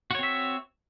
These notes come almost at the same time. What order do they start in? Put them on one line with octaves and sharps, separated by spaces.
F#4 C#5 C4 E5